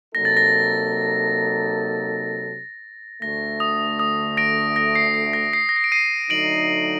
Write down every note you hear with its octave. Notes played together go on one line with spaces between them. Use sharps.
C3 F#3 A#3 D#4 A4 A#6
A6
A#6
D2 D3 A3 A#6
D#6
D#6
A#6 D7
A#6
C7
C7
A#6
C7
A#6
C7
D7
C7 D#7
D3 F#3 A3 D#4 D7 F#7